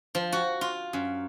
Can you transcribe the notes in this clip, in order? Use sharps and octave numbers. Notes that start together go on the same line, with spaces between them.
F3
F#4
F4
F#2